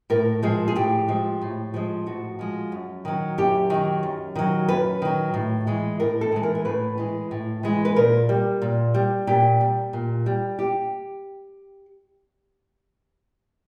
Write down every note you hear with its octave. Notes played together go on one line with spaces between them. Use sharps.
A2 A#4
F3 G#3 G#4
G#4
A2 G4
F3 G#3
A2
F3 G#3
A2 F#4
F3 G#3
F#2
D#3 F#3
F#2 G4
D#3 F#3
F#2
D#3 F#3
F#2 B4
D#3 F#3
A2
E3 G#3
A2 A#4
A4
E3 G#3
A#4
A#4
A2 B4
E3 G#3
A2
E3 G#3
B4
A#2 A#4
G3
A#2
G3
A#2 G4
G3
A#2
G3
G4